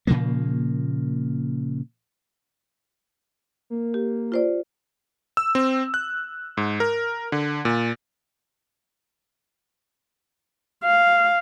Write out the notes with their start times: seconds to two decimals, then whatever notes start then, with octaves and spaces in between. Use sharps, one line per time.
0.07 A#2 C#3 F3 A#3
3.70 A#3
3.94 G4
4.32 F4 C5 D5
5.37 E6
5.55 C4
5.94 F#6
6.57 G#2
6.80 A#4
7.32 D3
7.65 A#2
10.84 F5